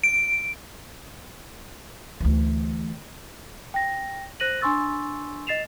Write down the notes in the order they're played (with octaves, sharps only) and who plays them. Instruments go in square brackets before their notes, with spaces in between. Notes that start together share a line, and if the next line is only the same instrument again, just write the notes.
[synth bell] D7
[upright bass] D2 E3
[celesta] G5 A#6
C5 F#6 A#6 D#7 F#7
D4 G#5 C6 C#6 E6 A6
D#5 A6 C7 E7 F7